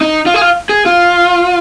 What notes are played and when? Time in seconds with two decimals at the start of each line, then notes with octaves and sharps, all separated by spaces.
0.01 D#4
0.26 F4
0.34 G#4
0.41 F4
0.69 G#4
0.86 F4